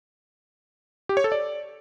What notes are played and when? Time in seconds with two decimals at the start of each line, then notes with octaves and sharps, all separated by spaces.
1.09 G4
1.17 C#5
1.24 A4
1.32 D5